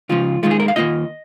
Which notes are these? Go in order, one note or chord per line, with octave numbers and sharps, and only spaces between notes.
C#2 C#3 F3 F4
D#2 D#3 G#3 F4
G#4
A#4
F5
D#2 C#3 A#3 F4 D#5